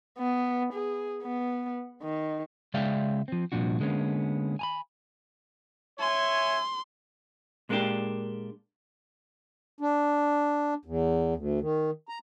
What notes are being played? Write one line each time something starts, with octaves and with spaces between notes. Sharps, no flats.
B3
G#4
B3
D#3
C#3 G#3 D5 E5 F5 G5
F3 C4
C2 F#2 A#2 F3 D4 F#4
D3 G#3 A#3 B3 C#4
G#5 A#5 B5
C#5 E5 G#5 C6
A#2 G#3 A#3 B3 D4 G4
D4
E2
D2
D#3
A#5